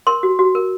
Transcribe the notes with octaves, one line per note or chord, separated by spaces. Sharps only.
A#4 C6
F#4
F#4
A#4